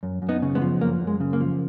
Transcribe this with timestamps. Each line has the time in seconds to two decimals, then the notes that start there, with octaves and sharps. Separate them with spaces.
0.03 F#2
0.22 F#2
0.29 B3 D#4
0.42 C#3
0.55 G#3 B3
0.62 F3
0.81 F#2 A#3
1.01 F#2
1.07 G#3
1.20 C#3
1.33 A#3
1.40 F3